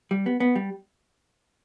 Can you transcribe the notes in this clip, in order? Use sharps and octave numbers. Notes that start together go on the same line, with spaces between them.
G3
B3
B3
G3